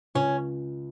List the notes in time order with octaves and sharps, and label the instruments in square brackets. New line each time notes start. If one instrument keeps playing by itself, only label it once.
[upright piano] C#2 [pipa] C#4